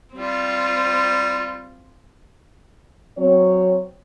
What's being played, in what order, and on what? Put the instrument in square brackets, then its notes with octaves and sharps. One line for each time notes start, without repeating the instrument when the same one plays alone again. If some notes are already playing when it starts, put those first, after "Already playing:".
[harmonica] G3 [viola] C4 F4
[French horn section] F#3 C4 C#5